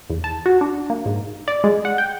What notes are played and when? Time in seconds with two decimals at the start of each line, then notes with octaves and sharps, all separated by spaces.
0.10 E2
0.24 A5
0.46 F#4
0.61 D4
0.90 A#3
1.06 G#2
1.48 D5
1.64 G#3
1.85 F#5
1.98 G5